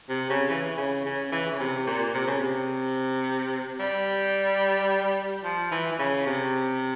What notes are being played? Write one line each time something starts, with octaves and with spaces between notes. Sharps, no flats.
C3
C#3
E3
C#3
C#3
E3
C#3
C3
A#2
C3
C#3
C3
G3
F3
E3
E3
C#3
C3